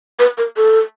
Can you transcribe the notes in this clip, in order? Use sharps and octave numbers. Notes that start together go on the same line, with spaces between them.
B4
A#4
A4